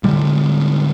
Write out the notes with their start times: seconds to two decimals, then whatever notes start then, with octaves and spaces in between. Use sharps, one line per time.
0.03 A2 D3 G3 G#3